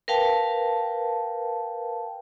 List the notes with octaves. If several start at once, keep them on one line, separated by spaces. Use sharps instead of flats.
A#4 B4 F5 G5 A5